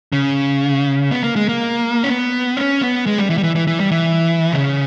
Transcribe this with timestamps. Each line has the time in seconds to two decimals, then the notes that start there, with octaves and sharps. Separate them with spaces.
0.13 C#3
1.11 B3
1.23 A#3
1.36 G#3
1.49 A#3
2.03 C#4
2.09 B3
2.57 C#4
2.82 B3
3.07 G#3
3.18 G3
3.30 E3
3.38 G3
3.43 E3
3.56 E3
3.67 E3
3.80 G3
3.91 E3
4.52 C#3